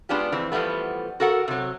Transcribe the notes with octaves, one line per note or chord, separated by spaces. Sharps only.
G#3 B3 D4 F4 G4
F2 E3 C4
E3 F3 G3 A3 B3
F#4 A4 A#4 F#5
C3 F#3